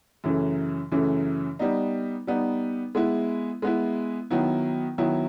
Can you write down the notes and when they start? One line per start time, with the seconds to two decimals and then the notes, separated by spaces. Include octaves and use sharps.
0.24 F#2 C#3 E3 A3
0.92 F#2 C#3 E3 A3
1.59 G3 B3 D#4
2.27 G3 B3 D#4
2.95 G#3 B3 E4
3.62 G#3 B3 E4
4.30 D#3 F#3 B3 E4
4.98 D#3 F#3 B3 E4